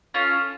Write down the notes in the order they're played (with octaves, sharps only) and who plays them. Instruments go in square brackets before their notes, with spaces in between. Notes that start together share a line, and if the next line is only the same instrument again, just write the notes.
[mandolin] C#4 F4 A4